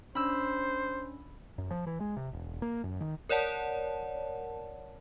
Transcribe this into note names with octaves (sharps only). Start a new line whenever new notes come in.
C#4 D4 C5 B5 E6
F#2
F3
E3
G#3
C3
E1
A#3
F#2
D#3
A#4 C#5 D5 F#5 A5